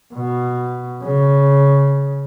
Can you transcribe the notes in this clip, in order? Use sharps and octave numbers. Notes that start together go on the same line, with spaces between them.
B2
C#3